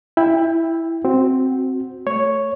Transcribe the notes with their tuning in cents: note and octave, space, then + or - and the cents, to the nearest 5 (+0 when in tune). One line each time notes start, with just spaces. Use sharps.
E4 +0 G5 +25
C4 +0 F#4 +0
A3 +0 C#5 +0